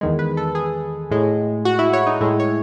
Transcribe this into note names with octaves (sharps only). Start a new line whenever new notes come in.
E2 D#3 G#3
B4
A4
G#4
A2 G#3
F#4
E4
C#5
D#4
A2 G#3 E4
C#5